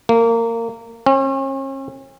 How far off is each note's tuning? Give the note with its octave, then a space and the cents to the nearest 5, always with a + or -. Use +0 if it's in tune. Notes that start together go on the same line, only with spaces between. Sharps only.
A#3 -20
C#4 -40